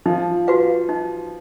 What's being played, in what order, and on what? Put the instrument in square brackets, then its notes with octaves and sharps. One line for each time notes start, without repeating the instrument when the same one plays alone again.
[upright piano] F3 [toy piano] D#4
[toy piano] F#4 B4 F5
D#4